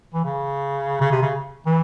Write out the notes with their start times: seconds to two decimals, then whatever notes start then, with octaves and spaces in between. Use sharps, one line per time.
0.14 E3
0.25 C#3
1.01 C#3
1.12 C3
1.22 C#3
1.66 E3